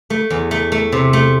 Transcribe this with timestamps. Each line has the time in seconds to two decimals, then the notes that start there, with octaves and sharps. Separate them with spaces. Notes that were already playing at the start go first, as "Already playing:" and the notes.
0.10 A3
0.30 E2
0.51 A3
0.72 A3
0.92 C3
1.13 A3